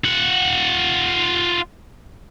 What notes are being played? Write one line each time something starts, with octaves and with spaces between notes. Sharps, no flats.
F4 F#5